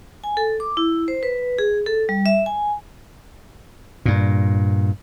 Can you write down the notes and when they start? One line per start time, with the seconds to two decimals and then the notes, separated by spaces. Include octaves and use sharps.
0.24 G#5
0.37 A4
0.60 D6
0.77 E4
1.08 C5
1.23 B4
1.58 G#4
1.86 A4
2.09 G3
2.26 E5
2.46 G#5
4.06 G2 A#2